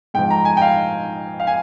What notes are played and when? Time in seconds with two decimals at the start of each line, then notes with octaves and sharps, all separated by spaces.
0.14 G#2 F3 G5
0.31 A#5
0.45 G#5
0.57 G5
0.61 F5
1.40 F5
1.47 G#5